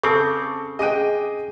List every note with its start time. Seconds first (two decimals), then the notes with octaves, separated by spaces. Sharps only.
0.03 C#3 C4 A4 D6
0.79 G#4 D#5 G5 D6 D#7